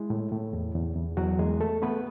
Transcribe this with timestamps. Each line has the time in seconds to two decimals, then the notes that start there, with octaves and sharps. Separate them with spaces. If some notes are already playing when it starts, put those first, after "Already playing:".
Already playing: G#3 E4
0.10 A2
0.32 A2
0.53 E2
0.75 E2
0.96 E2
1.17 E2 F#3 F#4
1.39 E2 G#3 G#4
1.61 A3 A4
1.82 A3 B3 B4